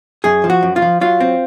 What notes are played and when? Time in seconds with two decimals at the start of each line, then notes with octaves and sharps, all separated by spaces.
0.24 F#2 G#4
0.44 F3
0.50 F#4
0.63 F#2
0.76 F4
0.82 F3
1.01 F#3 F4
1.20 C4